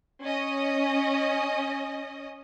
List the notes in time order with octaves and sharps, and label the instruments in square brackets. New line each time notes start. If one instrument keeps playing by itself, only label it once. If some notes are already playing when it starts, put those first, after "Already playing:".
[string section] C#4 D#5